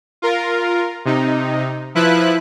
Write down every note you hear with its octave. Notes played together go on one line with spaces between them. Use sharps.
F4 A#4
C3 D#4
F3 E4 B4 F#6